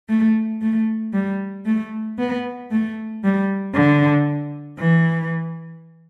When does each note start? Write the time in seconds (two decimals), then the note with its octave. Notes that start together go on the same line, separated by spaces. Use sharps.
0.08 A3
0.61 A3
1.13 G3
1.65 A3
2.18 B3
2.71 A3
3.23 G3
3.75 D3
4.79 E3